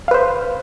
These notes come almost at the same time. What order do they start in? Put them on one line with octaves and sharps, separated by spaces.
F5 B4 C5